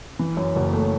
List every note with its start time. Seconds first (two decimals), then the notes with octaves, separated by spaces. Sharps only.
0.19 E3
0.37 F#2
0.56 F#1
0.73 A3